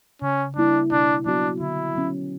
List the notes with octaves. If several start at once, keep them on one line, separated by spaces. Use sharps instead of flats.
C#3 C#4
G3 A#3 D4 E4
B2 D4
F#3 B3 D4 F#4
D3 E4
F#3 C#4